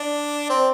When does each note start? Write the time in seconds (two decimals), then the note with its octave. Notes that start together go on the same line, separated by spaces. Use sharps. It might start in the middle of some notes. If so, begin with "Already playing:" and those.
Already playing: D4
0.49 C4